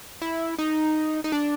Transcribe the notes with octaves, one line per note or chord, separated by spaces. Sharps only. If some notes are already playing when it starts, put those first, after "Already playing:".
E4
D#4
D#4
D4